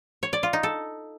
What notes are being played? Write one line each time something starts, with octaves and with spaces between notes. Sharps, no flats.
C#5
D5
F4
D#4
A4